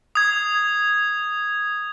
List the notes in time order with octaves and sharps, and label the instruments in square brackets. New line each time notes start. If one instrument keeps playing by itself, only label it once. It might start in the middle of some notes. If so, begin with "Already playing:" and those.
[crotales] D#6 G#6